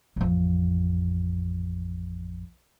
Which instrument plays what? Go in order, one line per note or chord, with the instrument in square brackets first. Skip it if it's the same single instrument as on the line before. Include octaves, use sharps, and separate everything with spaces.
[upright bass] A1 F2